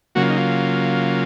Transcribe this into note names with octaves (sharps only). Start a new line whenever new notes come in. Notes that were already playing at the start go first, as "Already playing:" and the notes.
C#3 F#3 A#3 F#4
F4
D#4
F4